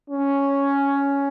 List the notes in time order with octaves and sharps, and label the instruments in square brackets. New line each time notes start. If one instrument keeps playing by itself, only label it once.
[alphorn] C#4